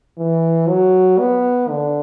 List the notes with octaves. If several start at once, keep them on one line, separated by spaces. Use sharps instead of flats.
E3
F#3
B3
D3